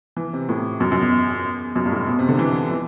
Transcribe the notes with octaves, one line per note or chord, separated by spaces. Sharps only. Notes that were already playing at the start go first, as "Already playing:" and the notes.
E3
C3
A2
F#2
F#2
E2
F#2
G2
A2
B2
C3
D3
E3
E3